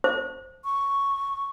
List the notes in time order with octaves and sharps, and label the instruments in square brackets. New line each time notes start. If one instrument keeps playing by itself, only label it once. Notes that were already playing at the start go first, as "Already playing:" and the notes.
[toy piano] C5
[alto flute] C#6